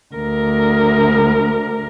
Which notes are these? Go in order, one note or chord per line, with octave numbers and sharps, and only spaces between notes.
D2 A#4